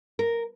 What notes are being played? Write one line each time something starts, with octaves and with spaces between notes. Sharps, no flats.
A#4